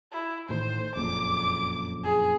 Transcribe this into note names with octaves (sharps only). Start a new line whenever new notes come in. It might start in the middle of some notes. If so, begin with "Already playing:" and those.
E4
A1 A2 D#3 C5
F#1 F2 A#2 D6
G#4